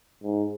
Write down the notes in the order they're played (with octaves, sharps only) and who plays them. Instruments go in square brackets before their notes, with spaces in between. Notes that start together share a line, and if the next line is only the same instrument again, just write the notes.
[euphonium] G#2